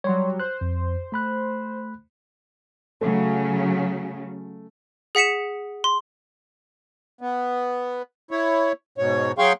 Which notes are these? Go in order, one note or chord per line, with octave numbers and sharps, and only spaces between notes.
F#3 G3 C#5 C6
C5 F#6
F2
A3 B5 F#6
C#3 F#3 A3
G#4 F#5 B6 C#7 E7
C6
B3
E4 C#5
G#2 B2 C#5
F#3 G#4 F5 G5 C6 C#6